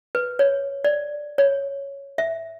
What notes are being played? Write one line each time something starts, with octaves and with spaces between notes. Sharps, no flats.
B4
C#5
D5
C#5
E5